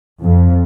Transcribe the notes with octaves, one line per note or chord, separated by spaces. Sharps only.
F2